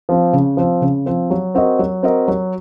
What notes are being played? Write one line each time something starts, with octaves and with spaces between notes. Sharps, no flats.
F3 C4
C#3
F3 C4
C#3
F3 C4
F#3
C4 F#4 A#4 D#5
F#3
C4 F#4 A#4 D#5
F#3